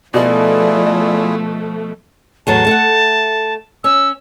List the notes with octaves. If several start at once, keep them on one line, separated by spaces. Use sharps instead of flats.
B2 F3 A3 E4 F4 G#4 D5
E2 A2 F#3 A5
A3 A4 F#5
C#4 E6